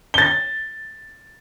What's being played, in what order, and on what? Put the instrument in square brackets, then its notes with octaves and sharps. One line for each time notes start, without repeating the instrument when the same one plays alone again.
[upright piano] A6 G7